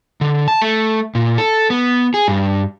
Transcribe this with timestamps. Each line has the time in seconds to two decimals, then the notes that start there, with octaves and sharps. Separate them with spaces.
0.21 D3
0.48 A5
0.62 A3
1.15 A#2
1.38 A4
1.70 B3
2.14 G#4
2.28 G2